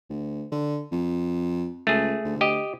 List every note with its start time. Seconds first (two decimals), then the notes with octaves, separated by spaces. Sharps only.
0.10 D2
0.52 D3
0.92 F2
1.87 C#2 A3 G#4
2.24 D2
2.41 G4 D#5